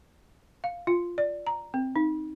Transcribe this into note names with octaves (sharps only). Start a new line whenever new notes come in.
F5
F4
D5
A#5
C4
D#4